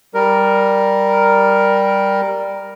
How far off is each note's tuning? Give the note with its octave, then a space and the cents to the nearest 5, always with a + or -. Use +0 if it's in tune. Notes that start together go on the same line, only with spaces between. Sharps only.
G3 +0 A#4 +0